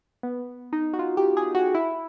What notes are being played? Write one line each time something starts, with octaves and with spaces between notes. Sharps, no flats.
B3
D#4
F#4
F4
G4
G#4
F#4
E4